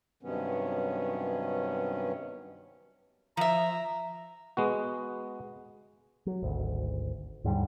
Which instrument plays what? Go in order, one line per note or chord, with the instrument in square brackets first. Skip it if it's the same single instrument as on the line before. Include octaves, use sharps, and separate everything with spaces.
[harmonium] G2 C3 D#3 F#3 B3 C#4
[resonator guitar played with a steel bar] F3 E5 [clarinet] A#5
[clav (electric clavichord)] G#3 B3 F#4
[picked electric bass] F#3
G#1 D2
D#2 G#2 D3 G3